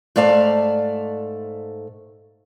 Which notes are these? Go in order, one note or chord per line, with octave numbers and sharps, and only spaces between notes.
G#2 A3 D5 F5 A5